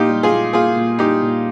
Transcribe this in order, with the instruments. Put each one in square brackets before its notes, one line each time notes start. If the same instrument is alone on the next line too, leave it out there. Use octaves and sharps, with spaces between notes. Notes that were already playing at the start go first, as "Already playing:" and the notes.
Already playing: [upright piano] A#2 A#3 [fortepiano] D#4 F4 G4
[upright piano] G3
[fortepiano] F4 G#4
[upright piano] A#2
[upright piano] A#3 [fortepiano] F4 G#4
[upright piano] A#2
[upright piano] G3 [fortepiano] D#4 G4
[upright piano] A#2